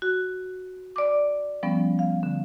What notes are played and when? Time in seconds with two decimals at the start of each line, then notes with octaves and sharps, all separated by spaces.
0.02 F#4
0.96 D5 D6
1.63 F3 G3 B3 C#4
1.99 F5
2.23 D3